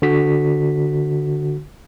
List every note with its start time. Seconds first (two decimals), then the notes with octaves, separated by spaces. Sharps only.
0.02 D3 F#4 B6